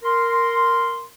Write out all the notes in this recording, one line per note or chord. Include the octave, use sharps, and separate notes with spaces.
A#4 C6